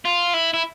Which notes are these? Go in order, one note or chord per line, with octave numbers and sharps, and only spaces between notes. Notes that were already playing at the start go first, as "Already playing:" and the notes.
F4
E4
E4